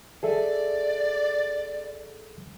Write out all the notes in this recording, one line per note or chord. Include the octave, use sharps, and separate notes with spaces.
G#4 A4 D5 E5